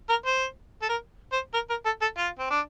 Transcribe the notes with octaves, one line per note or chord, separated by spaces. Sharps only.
A#4
C5
A4
A#4
C5
A#4
A#4
A4
A4
F4
C4
D4